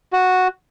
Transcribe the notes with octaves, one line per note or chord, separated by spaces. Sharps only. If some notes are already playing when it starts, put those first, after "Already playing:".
F#4